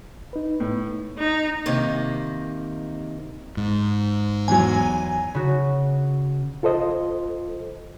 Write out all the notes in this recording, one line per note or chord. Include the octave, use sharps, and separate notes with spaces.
D#4 B4
A2
D#4
C3 D#3 A#3
G#2
E2 E3 F#3 G#5
C#3 F#4
F4 A4 C5 D#5